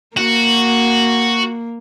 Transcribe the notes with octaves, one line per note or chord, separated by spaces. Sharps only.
A#3 F#4